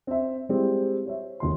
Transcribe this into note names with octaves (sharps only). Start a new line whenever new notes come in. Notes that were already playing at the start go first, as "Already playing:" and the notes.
C4 E5
G3 G#3 C4 E4 G4
C5 C#5 E5
F1 D#2 C6